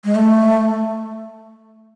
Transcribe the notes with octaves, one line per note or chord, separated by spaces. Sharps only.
G#3
A3